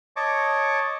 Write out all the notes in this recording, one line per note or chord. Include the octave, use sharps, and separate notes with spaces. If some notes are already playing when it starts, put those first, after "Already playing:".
C#5 D#5 A5 C#6 D6